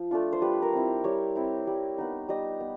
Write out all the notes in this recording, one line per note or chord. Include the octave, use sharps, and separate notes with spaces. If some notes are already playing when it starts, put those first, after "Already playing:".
Already playing: F3
A3 D4 F4
C5
G3 B4
A#4
C4 E4
G3 C#5
C4 E4
G3
B3 D#4
G3 D#5
B3